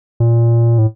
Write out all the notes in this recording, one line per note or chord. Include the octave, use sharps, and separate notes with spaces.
A#2
A2